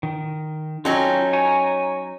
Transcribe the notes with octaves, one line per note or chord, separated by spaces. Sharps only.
D#3
F#3 C#4 D#4 F4 A4 G5
C#5 G#5 A#5